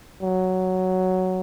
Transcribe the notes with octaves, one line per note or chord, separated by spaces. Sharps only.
F#3